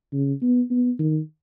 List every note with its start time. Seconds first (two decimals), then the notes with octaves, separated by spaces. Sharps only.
0.13 C#3
0.42 B3
0.70 B3
0.99 D#3